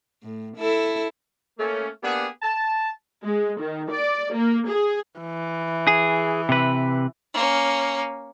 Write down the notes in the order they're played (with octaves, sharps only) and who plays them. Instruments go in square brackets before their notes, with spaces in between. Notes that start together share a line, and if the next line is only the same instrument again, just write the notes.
[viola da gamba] A2
E4 A4
[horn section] A3 A#3 C#4
A#3 B3 D4 G4 G#4 F#5
A5
[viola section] G#3
D#3
D5
A#3
G#4
[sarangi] E3
[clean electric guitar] G#4
C3 B4
[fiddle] A#3 C#4